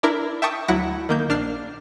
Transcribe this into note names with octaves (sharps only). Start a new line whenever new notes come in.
D4 E4 A#4
E5 G5 A5 C#6 D#6
D2 F#3 E4 F#5 A#6
D#3 A#3 G6
A#1 D4 F6 C7